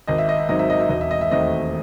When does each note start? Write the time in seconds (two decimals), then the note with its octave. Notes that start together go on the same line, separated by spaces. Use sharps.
0.07 G#1 D#5
0.18 E5
0.29 D#5
0.39 E5
0.49 G#2 F#3 C4 D#4 D#5
0.59 E5
0.70 D#5
0.80 E5
0.89 E1 D#5
1.01 E5
1.11 D#5
1.21 E5
1.31 D#2 D#3 A3 C4 D#5